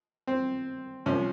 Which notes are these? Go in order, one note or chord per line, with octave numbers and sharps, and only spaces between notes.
C4
C2 C3 F3 C#4